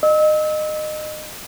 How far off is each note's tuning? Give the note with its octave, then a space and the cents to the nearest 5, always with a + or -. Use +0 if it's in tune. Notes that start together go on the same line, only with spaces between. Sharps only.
D#5 -25 E6 -35